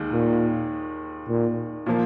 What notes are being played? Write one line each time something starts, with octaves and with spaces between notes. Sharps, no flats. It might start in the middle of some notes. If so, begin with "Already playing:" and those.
Already playing: D#2 D#3 G#3
A#2
A#2
A#2 F3 A#3